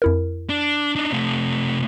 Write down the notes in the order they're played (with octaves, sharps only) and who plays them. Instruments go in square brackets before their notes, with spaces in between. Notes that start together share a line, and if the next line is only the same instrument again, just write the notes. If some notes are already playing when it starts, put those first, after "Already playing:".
[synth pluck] F2 E4 A#4
[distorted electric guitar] D4
D4 D#4
C3 A3